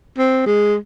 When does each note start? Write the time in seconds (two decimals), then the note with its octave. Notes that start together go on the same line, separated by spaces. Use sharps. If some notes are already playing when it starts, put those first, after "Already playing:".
0.18 C4
0.46 G#3